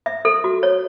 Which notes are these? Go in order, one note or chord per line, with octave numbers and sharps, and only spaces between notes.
E5
A4
F#4
C#5